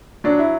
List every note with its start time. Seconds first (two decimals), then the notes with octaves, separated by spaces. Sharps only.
0.24 F#3 D4
0.39 E4